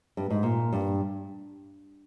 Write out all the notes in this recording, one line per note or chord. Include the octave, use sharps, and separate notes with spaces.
G2
G#2
A#2
G2